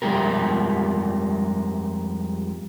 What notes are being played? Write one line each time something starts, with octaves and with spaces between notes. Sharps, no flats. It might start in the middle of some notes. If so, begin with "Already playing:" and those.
F2 F3 G3 G#3 G4 A#4